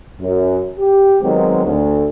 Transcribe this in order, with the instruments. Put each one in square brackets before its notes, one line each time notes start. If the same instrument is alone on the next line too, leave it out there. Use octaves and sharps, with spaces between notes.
[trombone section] F#2
G4
D#3 F#3 G#3 B3 C4
D2